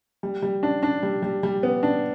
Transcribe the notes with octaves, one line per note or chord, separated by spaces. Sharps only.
G3
G3
D4
D4
G3
G3
G3
B3
D4